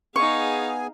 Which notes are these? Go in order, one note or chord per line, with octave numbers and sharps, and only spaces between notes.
B3 D#4 G#4 F5 G#5 C#6